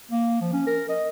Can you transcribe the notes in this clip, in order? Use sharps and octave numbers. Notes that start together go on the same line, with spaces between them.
A#3
F3
C#4
A#4
D#5